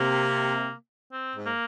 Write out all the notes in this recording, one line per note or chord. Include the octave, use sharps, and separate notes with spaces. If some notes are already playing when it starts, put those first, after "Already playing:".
Already playing: C3 A#3
C4
G#2
A#3